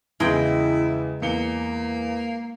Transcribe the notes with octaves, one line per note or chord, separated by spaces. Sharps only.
E2 C#3 G#3 E4 G5 D#6
E2 A#3 C#7 G7